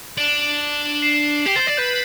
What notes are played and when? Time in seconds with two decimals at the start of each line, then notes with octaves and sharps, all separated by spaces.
0.18 D4 D7 F#7
0.81 E7
0.92 F#7
1.02 C7 E7
1.46 G4 C7
1.56 C5 A6
1.67 D5 A6
1.77 B4 G6